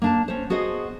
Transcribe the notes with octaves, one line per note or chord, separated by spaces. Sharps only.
A#3 D4 A5
C#4 C5
B3 F#4 G#4 C5 D#5